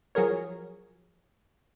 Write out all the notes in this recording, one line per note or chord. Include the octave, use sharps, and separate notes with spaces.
F3 F#3 G#4 A#4 C#5